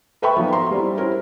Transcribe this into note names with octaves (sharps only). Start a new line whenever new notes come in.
A4 B4 E5 G5 B5 C#6
F3 F#3 A#3 B3 D#4 B4
E5 A#5 C6
G3 C4 D4 E4
C#4 E4 F#4 A#4 C5